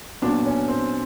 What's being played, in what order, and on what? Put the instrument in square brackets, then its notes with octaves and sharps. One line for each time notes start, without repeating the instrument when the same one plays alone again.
[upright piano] A#2 F#3 B3 D4
C#4
C4